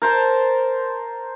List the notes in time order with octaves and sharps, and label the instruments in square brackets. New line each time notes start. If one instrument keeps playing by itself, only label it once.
[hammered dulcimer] A#4 C5 A5